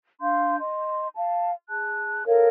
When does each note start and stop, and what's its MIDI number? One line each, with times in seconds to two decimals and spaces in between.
0.21 0.58 62
0.21 0.58 77
0.21 0.58 84
0.21 0.58 91
0.59 1.07 75
0.59 1.07 84
1.14 1.51 77
1.14 1.51 81
1.68 2.23 68
1.68 2.23 81
1.68 2.23 90
2.26 2.49 69
2.26 2.49 70
2.26 2.49 73
2.26 2.49 77